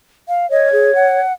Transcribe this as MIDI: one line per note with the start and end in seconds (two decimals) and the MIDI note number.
0.28 0.49 77
0.51 1.20 73
0.51 0.71 75
0.72 0.94 68
0.95 1.33 78